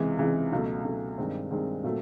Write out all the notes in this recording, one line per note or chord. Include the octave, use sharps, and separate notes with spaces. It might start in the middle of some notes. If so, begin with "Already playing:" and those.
Already playing: C#2 C3 E3 G#3
C#2 C3 E3 G#3
C#2 B2 F#3 A3
C#2 B2 F#3 A3
G2 D#3 G#3 C4
G2 D#3 G#3 C4
A#2 F#3 A3 C4